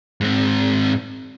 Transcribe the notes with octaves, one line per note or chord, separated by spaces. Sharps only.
G#2 C4